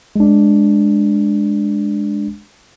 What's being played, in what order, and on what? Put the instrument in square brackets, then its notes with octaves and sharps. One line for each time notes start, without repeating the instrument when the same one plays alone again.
[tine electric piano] G#3 D4